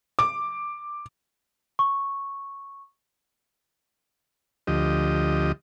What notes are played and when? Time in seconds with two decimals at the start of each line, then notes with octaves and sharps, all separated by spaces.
0.19 D6
1.79 C#6
4.67 D2 F3 G4 D#5